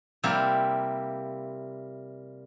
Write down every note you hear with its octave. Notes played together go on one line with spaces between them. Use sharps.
C3 G3 A#3 E4